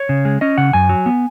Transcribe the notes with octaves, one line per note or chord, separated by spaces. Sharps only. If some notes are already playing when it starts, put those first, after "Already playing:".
Already playing: C#5
C#3
G#3
C#4 D#5
C#3 F#5
F#2 G#5
F#3
B3